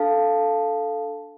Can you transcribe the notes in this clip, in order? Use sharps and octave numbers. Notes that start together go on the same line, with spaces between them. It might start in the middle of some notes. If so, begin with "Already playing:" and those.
Already playing: D4 A4 F5 A5